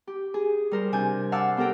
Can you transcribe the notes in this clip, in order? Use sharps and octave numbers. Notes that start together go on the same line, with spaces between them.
G4
G#4
G3 A#4 C5
C3 D4 G#5 G6
F5 F#5 A5 D6 E6
B3 G4 A4 A#4 G5